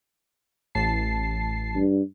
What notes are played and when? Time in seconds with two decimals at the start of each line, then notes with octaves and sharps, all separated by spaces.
0.75 A1 A5 C7
1.75 G2